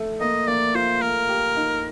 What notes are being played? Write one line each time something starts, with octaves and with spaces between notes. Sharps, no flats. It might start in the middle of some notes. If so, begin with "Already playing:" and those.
Already playing: A3
A#3 D#5
A#3 D5
F4 C5
A3 A#4
G4
D#4